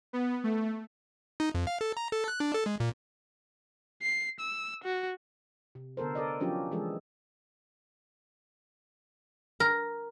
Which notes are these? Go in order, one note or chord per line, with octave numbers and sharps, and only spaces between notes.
B3
A3
D#4
F2
F5
A4
A#5
A4
F#6
D4
A4
G#3
A#2
C7
E6
F#4
C3
D3 B3 A4 A#4 C5
A4 A#4 D5 D#5
F3 F#3 C#4 D4 F4 G4
E3 F3 G#3 G#4 A4
A#4